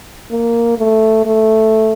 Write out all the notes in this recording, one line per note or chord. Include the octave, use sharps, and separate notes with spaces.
A#3
A3
A3